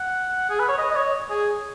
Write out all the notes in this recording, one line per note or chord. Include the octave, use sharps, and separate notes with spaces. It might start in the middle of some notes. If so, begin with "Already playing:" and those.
Already playing: F#5
G#4
B4
C#5
D#5
D#5
C#5
G#4